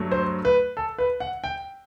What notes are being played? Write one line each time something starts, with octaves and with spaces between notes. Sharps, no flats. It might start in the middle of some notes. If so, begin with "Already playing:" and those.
Already playing: G2 F#3 A3
C5
B4
A4
B4
F#5
G5